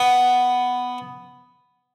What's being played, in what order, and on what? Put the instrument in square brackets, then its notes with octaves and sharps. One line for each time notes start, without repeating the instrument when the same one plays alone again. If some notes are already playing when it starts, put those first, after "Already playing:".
Already playing: [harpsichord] B3